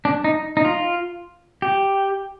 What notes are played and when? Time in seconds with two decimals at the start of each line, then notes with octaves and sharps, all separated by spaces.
0.05 D4
0.24 D#4
0.57 D#4
0.65 F4
1.62 G4